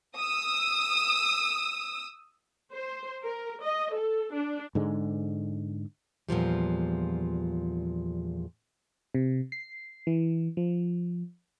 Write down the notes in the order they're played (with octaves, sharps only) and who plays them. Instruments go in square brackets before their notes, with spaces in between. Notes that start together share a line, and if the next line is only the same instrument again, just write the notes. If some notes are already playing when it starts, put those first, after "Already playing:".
[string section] D#6 E6
[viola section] C5
A#4
D#5
A4
D4
[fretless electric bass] G#2 D3 G#3
[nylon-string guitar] E2 A#2 F3 G3
[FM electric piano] C3
C7
E3
F3